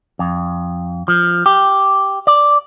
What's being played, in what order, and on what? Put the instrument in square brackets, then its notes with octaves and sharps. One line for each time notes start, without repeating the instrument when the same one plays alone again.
[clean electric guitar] F2
F3
G4
D5